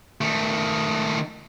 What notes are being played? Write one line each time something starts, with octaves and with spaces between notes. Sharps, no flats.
D#3 A3